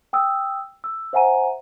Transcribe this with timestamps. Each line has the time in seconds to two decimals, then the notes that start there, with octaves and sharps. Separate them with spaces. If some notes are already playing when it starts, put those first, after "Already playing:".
0.13 G5 D#6 E6
0.84 E6
1.13 C5 E5 F#5 G#5 A#5 D#7